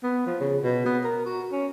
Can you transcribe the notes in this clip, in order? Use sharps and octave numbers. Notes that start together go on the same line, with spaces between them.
B3
F3
C#3
B2
B3
A#4
F#4
C#4